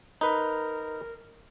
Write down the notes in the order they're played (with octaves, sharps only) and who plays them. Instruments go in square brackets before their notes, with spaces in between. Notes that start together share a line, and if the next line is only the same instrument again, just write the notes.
[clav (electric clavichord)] D#4 B4 [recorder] A#4